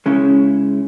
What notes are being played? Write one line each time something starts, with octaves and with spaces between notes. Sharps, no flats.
C#3 G#3 C#4 E4